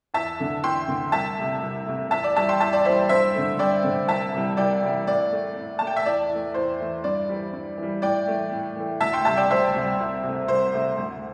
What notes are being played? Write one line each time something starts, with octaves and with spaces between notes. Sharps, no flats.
E2 E5 A5
D3 A3
E2 G5 C6
D3 A3
C2 E5 A5
C3 A3
C2
C3 A3
E2 E5 A5
D5
E3 G3 E5 A5
G5 C6
E2 E5 A5
D5
E3 G3 C5 E5
G2 C5 E5
D3 A3
G2 D5 G5
D3 A3
C2 E5 A5
C3 E3 G3
C2 D5 G5
C3 E3 G3
A2 D5
A3
A2
A3 A5
G5
E5
E2 D5
E3 A3
E2 C5
E3 A3
G2 D5
E3 G3
G2
E3
G3
A2 D5 G5
E3 A3
A2
E3 A3
D2 E5 A5
G5 C6
C3 G3 E5 A5
D5 G5
D2 C5 E5
C3 G3
C2
C3 A3
C2 C5
C3 A3
D2